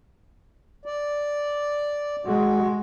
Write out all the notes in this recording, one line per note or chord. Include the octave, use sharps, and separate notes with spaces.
D5
G#3 F#4